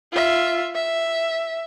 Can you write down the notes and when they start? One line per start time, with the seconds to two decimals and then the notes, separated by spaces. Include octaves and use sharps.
0.12 F4 E5
0.75 E5